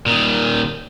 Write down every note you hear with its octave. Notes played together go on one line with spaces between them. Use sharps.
A#2 D#3